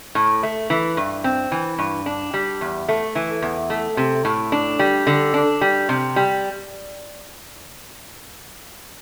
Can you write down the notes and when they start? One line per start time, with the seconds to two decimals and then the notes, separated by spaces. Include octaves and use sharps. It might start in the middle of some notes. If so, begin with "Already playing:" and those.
0.15 A2
0.43 A3
0.70 E3
0.97 G2
1.24 C4
1.52 E3
1.79 G2
2.06 D4
2.34 G3
2.61 E2
2.88 A3
3.15 E3
3.42 E2
3.70 A3
3.97 C3
4.25 A2
4.52 D4
4.79 G3
5.07 D3
5.34 D4
5.61 G3
5.89 C3
6.16 G3